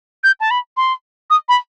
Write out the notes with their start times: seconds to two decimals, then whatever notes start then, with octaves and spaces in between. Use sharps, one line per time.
0.24 G6
0.40 A5
0.51 B5
0.77 C6
1.30 D#6
1.49 B5